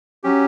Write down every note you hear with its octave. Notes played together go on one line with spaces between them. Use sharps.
F#3 C#4 G4